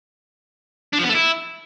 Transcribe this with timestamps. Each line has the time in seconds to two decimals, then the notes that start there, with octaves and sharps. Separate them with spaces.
0.93 D4
0.99 F3
1.04 B3
1.09 A3
1.15 E4